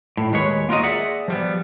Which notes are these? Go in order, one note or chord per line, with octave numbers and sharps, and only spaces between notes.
A2
D#2 G#3 B4 C#5
A#3 F4 F#4 A#4 D#5
G#4 D5 E5 F#5
F3 G3 B3